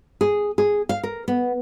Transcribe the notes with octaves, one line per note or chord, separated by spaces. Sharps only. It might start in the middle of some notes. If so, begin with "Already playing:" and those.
G#4
G#4
F5
A#4
B3